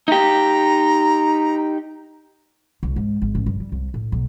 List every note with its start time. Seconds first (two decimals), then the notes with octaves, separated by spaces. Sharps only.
0.08 D#4 G4 A#5
2.83 C2
2.96 G#2
3.22 G#1
3.35 A1
3.46 G2
3.60 G3
3.72 C2
3.94 A2
4.12 B1